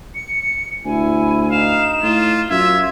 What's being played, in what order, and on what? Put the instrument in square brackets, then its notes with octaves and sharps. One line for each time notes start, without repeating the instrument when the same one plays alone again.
[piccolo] C#7
[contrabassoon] D2 [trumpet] E4 [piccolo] G#5
[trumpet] D#4 [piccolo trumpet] F5 [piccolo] E7
[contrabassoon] A2 [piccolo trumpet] F4
[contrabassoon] F#2 [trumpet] F4 [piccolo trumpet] E5 [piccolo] G#6